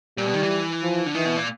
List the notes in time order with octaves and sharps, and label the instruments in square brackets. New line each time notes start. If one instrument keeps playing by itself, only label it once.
[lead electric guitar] A#2 [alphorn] G3
[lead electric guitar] B2
D#3
E3
[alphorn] F3
[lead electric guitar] D3
[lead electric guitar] D#3 [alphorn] E3
[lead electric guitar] B2
A#2